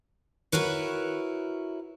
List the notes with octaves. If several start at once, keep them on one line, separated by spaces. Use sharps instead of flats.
E4 F#4 A#4 B4 C#5